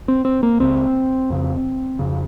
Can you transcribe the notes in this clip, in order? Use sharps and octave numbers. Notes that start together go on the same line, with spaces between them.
C4
C4
A#3
C#2 C#3 C4
F2 C#3
F2 C#3